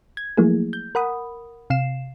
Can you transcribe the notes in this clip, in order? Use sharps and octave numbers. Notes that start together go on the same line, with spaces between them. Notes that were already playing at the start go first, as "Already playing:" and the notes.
G#6
F3 F#3 A3 A#3 E4 G#4
G6
A#4 F#5 B5 D#6
C3 F5 C7 E7